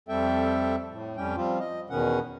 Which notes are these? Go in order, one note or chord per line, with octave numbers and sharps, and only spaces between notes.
F2 G3 C4 A4 E5 G5
A2
F2 G3 C#4 G5
F3 G3 C4 F4
D#5
E2 B2 D#3 C#4 F#5